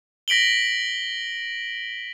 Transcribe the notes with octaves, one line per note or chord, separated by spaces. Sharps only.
A#6 B6 D7 F#7 G7